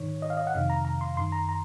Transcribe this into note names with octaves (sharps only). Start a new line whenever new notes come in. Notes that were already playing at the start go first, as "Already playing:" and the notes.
Already playing: G#2 D#3 C#5
D#5
F5
D#5
F#5
F2 C3 D#3 F5
A#5
A#5
C6
F#2 D#3 C6
A#5
A#5